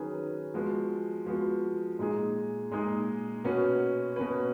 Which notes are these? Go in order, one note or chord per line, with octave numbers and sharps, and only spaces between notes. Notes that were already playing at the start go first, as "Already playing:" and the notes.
Already playing: D#3 F#3 C#4 G#4 B4
F3 G#3 B3 F#4
F3 G#3 B3 F#4
A#2 G#3 D#4 G#4
A#2 G#3 D#4 G#4
B2 A#3 C#4 F#4 B4
B2 A#3 C#4 F#4 B4